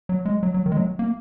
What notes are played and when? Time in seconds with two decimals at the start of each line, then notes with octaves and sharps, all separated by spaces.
0.09 F#3
0.25 G#3
0.43 F#3
0.54 F#3
0.66 D#3
0.72 G#3
0.77 F#3
0.99 A#3